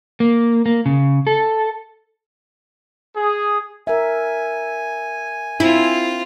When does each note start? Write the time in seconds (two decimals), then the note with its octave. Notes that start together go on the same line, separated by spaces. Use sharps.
0.20 A#3
0.66 A#3
0.86 C#3
1.27 A4
3.15 G#4
3.87 A#4 E5 G#5
5.60 C4 E4 F4